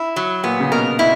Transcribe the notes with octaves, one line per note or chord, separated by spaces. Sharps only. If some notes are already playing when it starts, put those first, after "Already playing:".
Already playing: E4
F#3
A#2 B3
C#3
B2 A#4
B2 E4